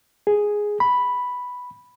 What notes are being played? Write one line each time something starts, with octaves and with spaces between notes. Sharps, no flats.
G#4
B5